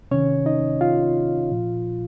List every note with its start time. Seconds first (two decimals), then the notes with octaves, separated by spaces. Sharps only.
0.11 C3 D#3 C#4 C#5
0.46 D#4 D#5
0.81 F4 F5
1.51 A#2 F3